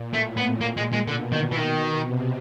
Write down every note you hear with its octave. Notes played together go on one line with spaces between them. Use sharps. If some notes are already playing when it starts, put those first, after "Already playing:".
Already playing: A#2
A2 A3
B3
A#2 A#3
G#3
G#3
B2 D3
D#3
E3
D#3
C3